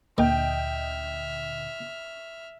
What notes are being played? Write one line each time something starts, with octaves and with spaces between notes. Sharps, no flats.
D2 A#2 D3 A#3 D#5 E5 G5 F6